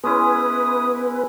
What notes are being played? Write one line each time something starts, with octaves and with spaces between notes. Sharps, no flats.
G#3 B3 C#4 E4 B4 D#6